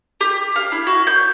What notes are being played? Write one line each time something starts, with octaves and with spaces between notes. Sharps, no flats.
G4
F5
E4
F#4
G6